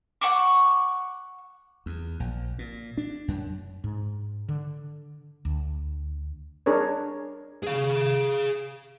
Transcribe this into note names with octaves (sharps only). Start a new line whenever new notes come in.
F#5 C#6 D6
E2
A#1
A#2
D4
F#2
G#2
D3
D2
D4 G#4 A#4 C#5
G#4 F5